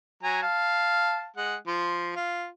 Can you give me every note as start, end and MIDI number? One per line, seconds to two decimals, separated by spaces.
0.23 0.41 54
0.23 0.41 80
0.23 0.41 82
0.42 1.26 77
0.42 1.26 81
1.37 1.56 56
1.37 1.56 78
1.67 2.13 53
1.67 2.13 84
2.16 2.47 65